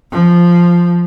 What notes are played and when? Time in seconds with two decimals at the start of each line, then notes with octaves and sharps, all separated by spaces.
0.11 F3